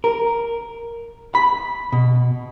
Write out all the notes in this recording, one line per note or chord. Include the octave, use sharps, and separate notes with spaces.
A#4
B5
B2